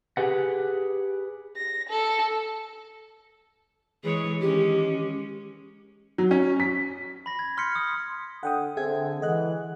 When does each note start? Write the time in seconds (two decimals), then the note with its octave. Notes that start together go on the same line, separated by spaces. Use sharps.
0.17 G4 G#4 B4 F#5
1.57 A#6
1.89 A4
4.04 E3 G#3 G#4 C#5
4.40 D#3 G#3 C#4 G4
6.18 F#3
6.31 C#4
6.60 B6
7.26 B5 A#6
7.39 G#6
7.57 C6 F6 G6 B6 C#7
7.75 D#6
8.43 D3 F#5 G5 D#6
8.77 D3 C4 G#4 E5 G#6
9.22 E3 G#3 D#5 F#5 F#6